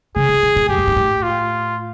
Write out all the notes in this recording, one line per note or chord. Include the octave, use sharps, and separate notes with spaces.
C#3 G#4
C3
B2
A#2
F#2 G4
G2
G#2
A2
F4